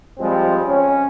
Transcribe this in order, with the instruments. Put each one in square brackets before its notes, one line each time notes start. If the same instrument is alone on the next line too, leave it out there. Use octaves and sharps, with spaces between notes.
[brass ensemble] F3 G3 G#3 C4
C#4